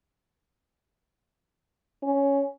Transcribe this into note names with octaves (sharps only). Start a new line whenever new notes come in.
C#4